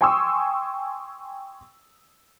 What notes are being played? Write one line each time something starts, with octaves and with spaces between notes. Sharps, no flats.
G5 G#5 C6 C#6 D#6 E6